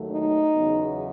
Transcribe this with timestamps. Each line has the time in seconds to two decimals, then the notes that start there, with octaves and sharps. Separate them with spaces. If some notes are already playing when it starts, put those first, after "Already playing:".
Already playing: D#2 D#3 F#3 A3
0.12 D#4
0.55 E2 C#3 F#3 B3